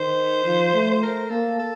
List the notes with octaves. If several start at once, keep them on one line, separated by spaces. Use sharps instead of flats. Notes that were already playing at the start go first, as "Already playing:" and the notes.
Already playing: D#3 C5
F3
A3
C5
A#4
A#3 A4
A4